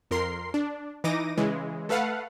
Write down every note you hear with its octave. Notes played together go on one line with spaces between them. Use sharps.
F2 A#4 C6 C7
D4
E3 D#4 D6 A#6 D#7
C#3 E3 G#3
A3 A4 B4 F5 F#5